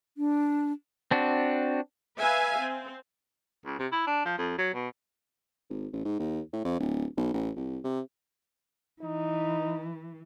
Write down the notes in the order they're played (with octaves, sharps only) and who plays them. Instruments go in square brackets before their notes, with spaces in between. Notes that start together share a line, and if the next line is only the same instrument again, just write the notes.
[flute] D4
[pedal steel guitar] C4 D4 F#4
[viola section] B4 E5 F5 G#5
C4
[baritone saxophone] C#2
C3
E4
D4
F3
F2
F#3
B2
[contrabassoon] G#1
A1
G#2
D#2
A2
F2
D1
B1
A1
C2
C3
[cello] E3 [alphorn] D#4